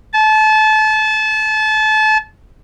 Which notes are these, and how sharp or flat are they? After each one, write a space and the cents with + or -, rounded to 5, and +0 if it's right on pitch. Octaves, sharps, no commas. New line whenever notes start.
A5 -30